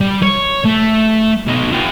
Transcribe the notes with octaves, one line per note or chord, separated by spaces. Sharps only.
G3
C#5
A3
B2 D#4
F4 G4